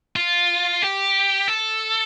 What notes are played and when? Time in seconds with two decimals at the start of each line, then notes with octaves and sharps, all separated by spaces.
0.16 F4
0.82 G4
1.48 A4